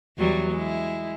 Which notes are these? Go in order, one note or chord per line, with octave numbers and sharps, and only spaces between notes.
E2 F#3 G3
G#3 E4